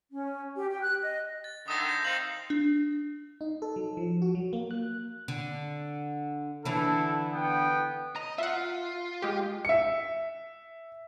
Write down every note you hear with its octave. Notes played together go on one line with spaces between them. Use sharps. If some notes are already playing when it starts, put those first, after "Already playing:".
C#4
G4
G5
F#6
D#5
A6
D3 D#3 E5 D#6 A#6
G6 A#6
C4 D#4 F5 F#7
D4
D#4
A4
F#3
F3
F#4
F#3
A#3
F#6
D3
D3 E3 D4 E4 A4
B3 G5
D#5 A#5
F4 E5 F#5
G#3 G4
E5 C#7